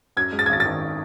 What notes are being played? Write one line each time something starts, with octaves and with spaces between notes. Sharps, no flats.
F#2 G#6
G#3
A6
G#6
G#1 A6
A6
D#3